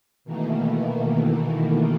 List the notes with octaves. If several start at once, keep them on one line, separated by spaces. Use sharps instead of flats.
B2 D#3 E3 A3 A#3